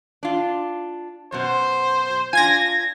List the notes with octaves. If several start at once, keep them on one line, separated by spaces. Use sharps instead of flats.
D4 F4
F#2 B2 C5
D4 F4 G#5 G#6 A#6